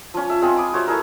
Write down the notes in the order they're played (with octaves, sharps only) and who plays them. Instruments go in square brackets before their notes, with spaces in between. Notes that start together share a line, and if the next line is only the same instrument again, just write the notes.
[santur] F3 C#4
E5
G#3 C4 F4 G#4
B5 D6 D#6
F#4 C5 C#5 E5
A3 E4 G#4 A#4